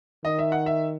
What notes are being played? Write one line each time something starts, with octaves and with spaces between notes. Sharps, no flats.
D#3 D#5
E5
F#5
E5